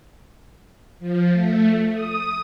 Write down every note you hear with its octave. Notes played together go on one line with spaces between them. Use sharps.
F3
A3
D#6